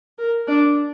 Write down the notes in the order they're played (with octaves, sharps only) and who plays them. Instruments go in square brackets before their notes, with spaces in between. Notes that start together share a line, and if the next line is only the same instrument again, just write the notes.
[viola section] A#4
D4